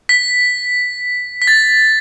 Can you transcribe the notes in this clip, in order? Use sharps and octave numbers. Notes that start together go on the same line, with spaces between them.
B6
B6
A6